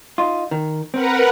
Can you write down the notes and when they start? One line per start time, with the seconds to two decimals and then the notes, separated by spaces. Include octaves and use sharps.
0.18 D#4 F4
0.51 D#3
0.94 C4 A#4 B4 F#5